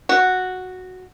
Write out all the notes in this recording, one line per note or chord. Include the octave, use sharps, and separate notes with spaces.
F#4